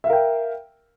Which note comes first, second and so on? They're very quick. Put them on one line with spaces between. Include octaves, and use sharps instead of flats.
E5 F5 A#4 G5